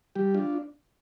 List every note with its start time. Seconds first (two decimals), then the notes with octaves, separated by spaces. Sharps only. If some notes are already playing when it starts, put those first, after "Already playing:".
0.15 G3 G4
0.34 D4 F4